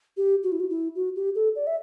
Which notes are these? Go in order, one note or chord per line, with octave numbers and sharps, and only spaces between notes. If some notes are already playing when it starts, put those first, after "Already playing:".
G4
F#4
E4
F#4
E4
F#4
G4
A4
D5
E5